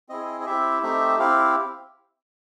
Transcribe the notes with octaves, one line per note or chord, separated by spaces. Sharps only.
C4 E4 G#4 D#5
D#5
C4 E4 G4 E5
A3 C4 D#4 G4 E5
C4 E4 G4 F5